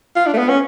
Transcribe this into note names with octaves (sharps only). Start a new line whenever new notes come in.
F4
D4
A3
B3
C#4